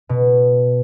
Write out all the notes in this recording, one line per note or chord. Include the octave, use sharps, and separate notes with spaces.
B2